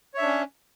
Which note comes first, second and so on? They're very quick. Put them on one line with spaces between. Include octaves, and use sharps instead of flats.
C#5 E5 D4 C#4